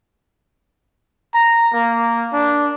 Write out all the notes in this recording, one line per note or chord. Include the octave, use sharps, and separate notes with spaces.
A#5
A#3
D4